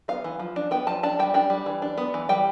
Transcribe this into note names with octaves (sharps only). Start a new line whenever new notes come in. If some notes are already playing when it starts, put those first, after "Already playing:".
B3 F5
E3
F3
D4
B3 G5
F3 A5
D4 A5
G3 G5
D4 G5
G3
E3
D4
B3
E3
G3 G5